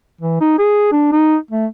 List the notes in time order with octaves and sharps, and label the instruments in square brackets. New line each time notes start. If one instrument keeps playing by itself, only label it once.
[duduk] E3
D#4
G#4
D4
D#4
A3